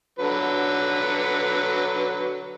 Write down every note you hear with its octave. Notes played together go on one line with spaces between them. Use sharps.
D3 F#3 B4